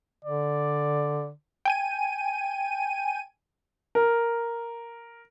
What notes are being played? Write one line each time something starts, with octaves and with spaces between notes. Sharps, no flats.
D3 D5
G5 G#5 D#7
A#4